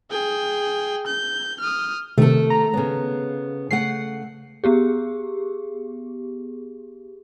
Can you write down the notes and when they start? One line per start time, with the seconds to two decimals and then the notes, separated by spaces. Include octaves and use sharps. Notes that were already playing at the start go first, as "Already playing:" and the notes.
0.11 G#4 G5
1.06 G6
1.60 D#6 F6
2.18 C3 D#3 A3 A4
2.50 A#5
2.73 C#3 B3
3.71 C#3 A3 F#5 C7
4.64 B3 G4 G#4